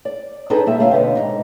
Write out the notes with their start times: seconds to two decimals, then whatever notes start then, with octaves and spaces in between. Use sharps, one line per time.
0.05 D5
0.50 C4 D4 D#4 G#4 A4 B4
0.66 A#2 G3 E5 A#5
0.79 D3 A#3 F4 C#5 E5 F5
0.91 B2 D3 B3 C4
1.15 G#2 C#3 D#4